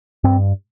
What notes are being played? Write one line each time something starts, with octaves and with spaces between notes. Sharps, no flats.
G2 C4